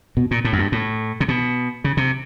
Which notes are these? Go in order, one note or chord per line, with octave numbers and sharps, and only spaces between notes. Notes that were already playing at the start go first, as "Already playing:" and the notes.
B2
A#2
A2
F#2
G2
A2
C3
B2
C#3
C3